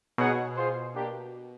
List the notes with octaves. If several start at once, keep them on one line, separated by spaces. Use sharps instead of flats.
B2 D#4 G#4 C#5 F#5
F4 G#4 C5
A#3 D4 G4